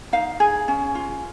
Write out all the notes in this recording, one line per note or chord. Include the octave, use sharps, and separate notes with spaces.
D#4 F5
G#4
C#4
F4